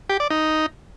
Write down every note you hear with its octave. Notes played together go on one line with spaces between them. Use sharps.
G4
D5
D#4